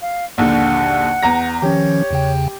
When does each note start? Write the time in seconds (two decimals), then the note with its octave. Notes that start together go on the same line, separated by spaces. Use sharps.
0.02 F5
0.38 A#1 D#2 D3 F#5
1.22 E2 A#5 A#6
1.62 D#3 F3 C#4 G4 C#5
2.11 E2 C#3 G5